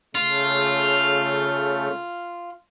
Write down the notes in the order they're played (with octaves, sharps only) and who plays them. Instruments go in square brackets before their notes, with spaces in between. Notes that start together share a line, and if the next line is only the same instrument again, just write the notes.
[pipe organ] C#3 A3 [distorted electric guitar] F4